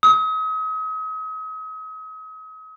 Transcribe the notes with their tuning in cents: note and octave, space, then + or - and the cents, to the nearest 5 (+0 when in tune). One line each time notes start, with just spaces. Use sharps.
D#6 +40